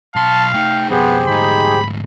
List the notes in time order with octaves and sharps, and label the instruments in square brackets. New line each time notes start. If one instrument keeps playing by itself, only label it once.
[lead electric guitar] B1 C6 [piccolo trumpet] F5 [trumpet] A5
[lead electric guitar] A3 D#4 [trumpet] G5
[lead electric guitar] F2 B2 [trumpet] B3 [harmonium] G4 G#4 C5
[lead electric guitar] D2 G#2 [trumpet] D#4 [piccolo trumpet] B5